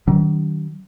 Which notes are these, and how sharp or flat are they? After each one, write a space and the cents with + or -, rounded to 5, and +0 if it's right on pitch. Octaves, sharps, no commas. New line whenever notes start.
D#3 +0 F#3 +40 C#4 +40